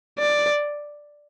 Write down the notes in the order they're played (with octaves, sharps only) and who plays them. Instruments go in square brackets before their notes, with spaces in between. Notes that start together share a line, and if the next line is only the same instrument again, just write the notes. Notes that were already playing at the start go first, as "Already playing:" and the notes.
[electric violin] D5